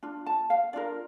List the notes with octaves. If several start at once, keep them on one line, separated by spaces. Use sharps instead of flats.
D4 F4
A5
F5
D4 F4 A#4 D5